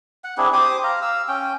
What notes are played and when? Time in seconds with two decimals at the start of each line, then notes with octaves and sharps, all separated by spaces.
0.24 F#5
0.38 C4 D4 E4 G#4
0.53 G4 C5 D6 D#6
0.83 F5 A#5
1.02 F5 E6
1.28 C#4 G5